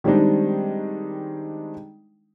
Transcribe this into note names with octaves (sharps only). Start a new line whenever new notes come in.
D#3 G3 G#3 C4 D4 D#4